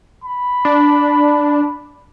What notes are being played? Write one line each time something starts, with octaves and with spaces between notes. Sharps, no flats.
B5
D4